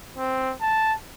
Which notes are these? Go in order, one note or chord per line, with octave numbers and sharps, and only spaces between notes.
C4
A5